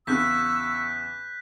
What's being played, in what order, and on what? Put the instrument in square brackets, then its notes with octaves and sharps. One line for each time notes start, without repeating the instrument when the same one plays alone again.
[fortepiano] E2 C#3 [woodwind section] C#6 E6 [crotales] F#6 G6 B6